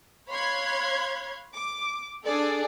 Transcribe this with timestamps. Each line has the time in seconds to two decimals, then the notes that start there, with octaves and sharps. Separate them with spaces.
0.29 C#5 F5 B5 C6 F#6 G#6
1.54 D6
2.25 D4 G#4 A4 D5